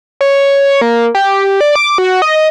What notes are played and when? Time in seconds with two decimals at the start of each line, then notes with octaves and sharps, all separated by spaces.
0.21 C#5
0.81 A#3
1.15 G4
1.61 D5
1.76 D6
1.98 F#4
2.22 D#5